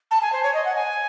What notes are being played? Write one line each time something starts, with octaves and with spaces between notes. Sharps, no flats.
A5
G#5
C5
C#5
D#5
F#5
G#5